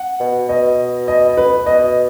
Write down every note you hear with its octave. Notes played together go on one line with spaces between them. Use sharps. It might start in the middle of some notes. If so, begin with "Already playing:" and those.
Already playing: F#5
B2
B2 D#5
D#5
B4
B2 D#5